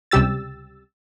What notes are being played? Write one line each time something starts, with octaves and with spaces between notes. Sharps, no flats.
C#2 C3 G3 G4 E6 A6